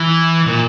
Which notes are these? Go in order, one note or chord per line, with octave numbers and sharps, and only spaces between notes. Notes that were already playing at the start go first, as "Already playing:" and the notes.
Already playing: E3
A#2